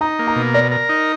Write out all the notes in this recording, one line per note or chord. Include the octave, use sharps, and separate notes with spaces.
D#4 A#5
A#3
A#5
B2
A#4 D5
A#4
D#4